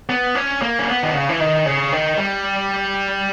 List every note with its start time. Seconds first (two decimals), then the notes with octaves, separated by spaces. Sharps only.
0.09 B3
0.35 C#4
0.62 A#3
0.79 C#4
0.87 B3
1.03 D#3
1.14 C#3
1.29 E3
1.40 D#3
1.66 C#3
1.92 D#3
2.18 G3